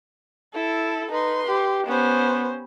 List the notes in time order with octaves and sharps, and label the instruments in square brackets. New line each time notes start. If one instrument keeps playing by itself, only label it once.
[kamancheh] E4 [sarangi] A4
[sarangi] D#4 [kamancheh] B4 C6
[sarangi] G4
[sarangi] B3 [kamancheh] C#4 C5